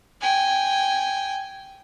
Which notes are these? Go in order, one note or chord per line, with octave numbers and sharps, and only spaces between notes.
G5 G#5